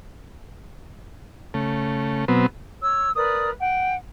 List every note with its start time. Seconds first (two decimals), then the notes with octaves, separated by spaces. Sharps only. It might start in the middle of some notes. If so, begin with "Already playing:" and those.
1.54 C#3 A3
2.28 B2 F#3 B3 C4
2.82 C#5 E6
3.16 A#4 B4 D5 D#6
3.60 F#5 G5